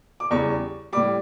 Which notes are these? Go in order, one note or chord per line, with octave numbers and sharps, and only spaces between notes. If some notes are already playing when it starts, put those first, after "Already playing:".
D6
E2 C#3 G3 C#6
A2 G3 D6